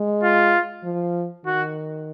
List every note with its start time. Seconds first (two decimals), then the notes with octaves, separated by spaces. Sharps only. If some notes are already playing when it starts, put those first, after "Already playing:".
Already playing: G#3
0.23 F4
0.84 F3
1.45 D#3 F#4